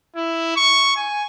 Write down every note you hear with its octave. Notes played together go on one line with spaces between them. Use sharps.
E4
C#6
G#5